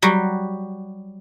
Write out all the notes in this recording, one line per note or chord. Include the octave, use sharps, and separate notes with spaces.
F#3 G3 F#4